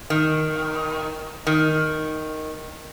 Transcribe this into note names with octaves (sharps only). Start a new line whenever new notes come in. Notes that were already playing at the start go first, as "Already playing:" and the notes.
D#3
D#3